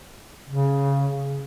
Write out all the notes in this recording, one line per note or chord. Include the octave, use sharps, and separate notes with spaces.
C#3